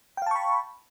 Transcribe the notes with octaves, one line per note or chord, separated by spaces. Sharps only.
F5 G5 A5 B5 C#6